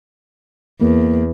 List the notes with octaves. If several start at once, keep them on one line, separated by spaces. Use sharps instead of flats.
E2 A#3